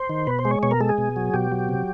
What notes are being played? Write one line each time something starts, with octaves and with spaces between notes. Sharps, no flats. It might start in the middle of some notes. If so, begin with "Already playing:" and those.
Already playing: C5
D#3
B2 B4
C5
G#3
C#5
B2 C#5
A#4
G#3 A4
G#4
B2
F#3
B2 G4
F#3
C3